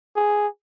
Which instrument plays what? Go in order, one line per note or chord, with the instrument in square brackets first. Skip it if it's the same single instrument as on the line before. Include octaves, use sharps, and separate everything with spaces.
[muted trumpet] G#4